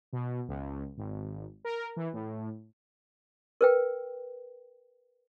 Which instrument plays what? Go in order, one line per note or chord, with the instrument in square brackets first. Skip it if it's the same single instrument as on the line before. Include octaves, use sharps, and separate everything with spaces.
[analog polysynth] B2
C#2
G#1
A#4
E3
A2
[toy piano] A#4 B4 G5